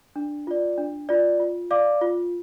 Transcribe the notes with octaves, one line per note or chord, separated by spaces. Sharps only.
D4
F4 D5
D4
F4 D5
F4
D5 F5 D6
F4